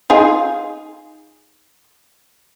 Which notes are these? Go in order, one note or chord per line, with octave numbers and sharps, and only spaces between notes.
D#4 F4 G#4